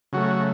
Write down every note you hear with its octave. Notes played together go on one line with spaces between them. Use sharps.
C#3 F#3 A3 F#4